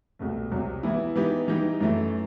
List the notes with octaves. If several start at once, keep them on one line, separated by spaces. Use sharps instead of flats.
C2 B2 A3
C2 C3 F#3
E3 B3 E4
E3 B3 D#4 G4
E3 G3 D#4 G4
F#2 E3 A3